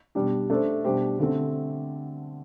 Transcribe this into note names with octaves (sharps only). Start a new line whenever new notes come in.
B2 G3 D4 G4
A3 D4 A4 C5
B2 G3 D4 G4 C5
D3 A3 C4